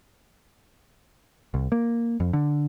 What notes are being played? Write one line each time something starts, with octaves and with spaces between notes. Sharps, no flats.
C2
A#3
F2
D3